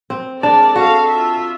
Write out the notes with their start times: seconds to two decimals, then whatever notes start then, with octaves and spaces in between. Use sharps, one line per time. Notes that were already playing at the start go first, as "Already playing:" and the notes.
0.10 C4
0.43 G#3 D4 A#4 D5 A5
0.76 F#4 A4 F5
1.08 F4 E5